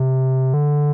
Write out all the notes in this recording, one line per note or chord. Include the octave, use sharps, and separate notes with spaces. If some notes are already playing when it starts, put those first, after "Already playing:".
Already playing: C3
D3